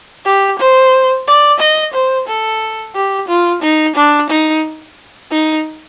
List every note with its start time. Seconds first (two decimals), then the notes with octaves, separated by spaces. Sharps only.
0.26 G4
0.59 C5
1.27 D5
1.60 D#5
1.93 C5
2.28 A4
2.95 G4
3.28 F4
3.62 D#4
3.96 D4
4.30 D#4
5.31 D#4